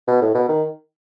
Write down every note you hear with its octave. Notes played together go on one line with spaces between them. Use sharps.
B2
A2
B2
D#3